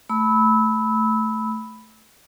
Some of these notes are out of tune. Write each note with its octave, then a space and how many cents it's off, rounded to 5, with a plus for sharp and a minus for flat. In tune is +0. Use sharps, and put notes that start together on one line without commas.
A3 +0 B5 +0 E6 -25